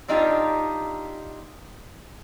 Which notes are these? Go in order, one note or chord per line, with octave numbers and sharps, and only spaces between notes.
C4 D4 D#4 F4 G4